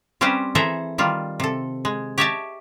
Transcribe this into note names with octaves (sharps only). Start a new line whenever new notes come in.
G3 C4 C#4 G4 B4 C5
E3 G#4 A4 C5 E5 A#5
D#3 G3 F4
C3 A4
G#3
G4 C#5 D#5 E5 G5 A5